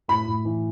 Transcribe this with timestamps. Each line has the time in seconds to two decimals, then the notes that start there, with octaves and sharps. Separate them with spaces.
0.08 A2 B5
0.26 A2
0.45 E3